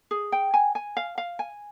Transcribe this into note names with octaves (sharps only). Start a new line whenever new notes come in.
G#4
G5
G#5
G#5
F5
F5
G#5